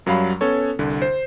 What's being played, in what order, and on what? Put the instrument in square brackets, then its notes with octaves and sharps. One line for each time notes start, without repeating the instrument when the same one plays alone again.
[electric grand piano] F#2 F#3 G3 F5 B5
B3 C#4 A4 C#5
C2 D3
C5